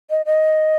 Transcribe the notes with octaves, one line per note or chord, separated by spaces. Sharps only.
D#5
D#5